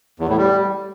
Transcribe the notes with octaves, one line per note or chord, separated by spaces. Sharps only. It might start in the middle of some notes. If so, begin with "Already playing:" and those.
E2
A2
G3